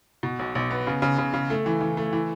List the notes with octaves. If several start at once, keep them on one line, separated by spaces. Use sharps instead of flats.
B2
B1
B1
B3
C#3
C#3
C#3
C#3
A3
E3
E3
A3
E3